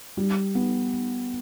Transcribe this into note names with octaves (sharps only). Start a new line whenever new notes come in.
G3
B3